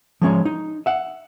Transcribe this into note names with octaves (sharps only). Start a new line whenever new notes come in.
F3 G#3 C#4 C#5
D#4
E5 F#5